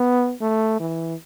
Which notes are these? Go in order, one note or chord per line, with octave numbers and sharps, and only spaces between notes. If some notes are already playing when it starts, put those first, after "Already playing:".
Already playing: B3
A3
E3